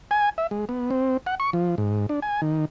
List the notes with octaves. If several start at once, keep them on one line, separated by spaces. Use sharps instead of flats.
G#5
E5
G#3
B3
C4
F#5
C#6
F3
G#2
D4
G#5
D#3